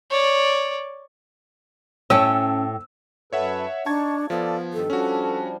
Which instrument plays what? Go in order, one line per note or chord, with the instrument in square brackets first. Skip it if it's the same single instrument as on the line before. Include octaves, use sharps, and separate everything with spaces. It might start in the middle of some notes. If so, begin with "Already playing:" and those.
[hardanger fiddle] C#5 D5
[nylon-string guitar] A2 G5 A5 [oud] C#4 [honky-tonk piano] E6
[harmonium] F#2 A4 B4 [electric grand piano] C#5 E5 F#5
[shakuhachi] D4 [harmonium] D#4 [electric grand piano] A5 C#6 G#6
[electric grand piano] F3 B3 [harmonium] A4 D5 [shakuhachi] F5
[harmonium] G2 D#3 [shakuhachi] A4
[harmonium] F3 G3 D4 [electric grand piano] C#4 F#4